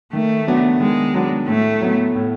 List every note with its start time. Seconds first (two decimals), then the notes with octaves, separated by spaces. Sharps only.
0.13 D#3 A3
0.48 F#3 B3 D4 F#4
0.80 D#3 G#3
1.14 F#3 B3 D4 F#4
1.48 A2 A3
1.81 F#3 B3
2.15 A2